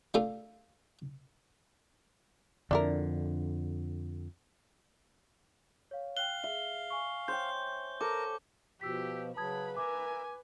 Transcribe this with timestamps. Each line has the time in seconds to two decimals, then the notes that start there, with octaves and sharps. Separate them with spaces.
0.14 A3 D4 F4 A4
2.71 F2 D3 D4 E4 A#4
5.91 C#5 F5
6.17 F5 G5 F#6 G7
6.44 G#4 E5
6.90 G#5 C#6
7.28 C5 C#5 G5 G6
8.01 A4 A#4 D6
8.81 B2 F3 F#4 G4 E6 B6
9.37 C#3 F#3 B4 A5 B5 D#6 G#6
9.77 A#4 E5 G#5 D6